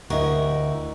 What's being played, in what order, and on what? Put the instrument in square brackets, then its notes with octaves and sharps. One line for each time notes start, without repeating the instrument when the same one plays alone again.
[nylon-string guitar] D2 [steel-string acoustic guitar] E4 A#4 [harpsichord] F#4 G4 D#5